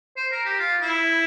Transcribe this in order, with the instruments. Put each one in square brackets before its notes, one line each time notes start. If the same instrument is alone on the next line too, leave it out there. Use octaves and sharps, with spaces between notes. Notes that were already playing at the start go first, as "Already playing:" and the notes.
[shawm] C5
A#4
G4
F4
E4